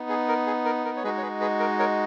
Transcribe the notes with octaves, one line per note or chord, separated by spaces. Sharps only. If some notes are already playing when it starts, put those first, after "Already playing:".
Already playing: B3 D#4
G#4
A#4
G#4
A#4
A#4
C#5
G#3 D#4 F#4 G#4 B4
C#5
G#4 B4
G#4 B4
A#4
A#4 C#5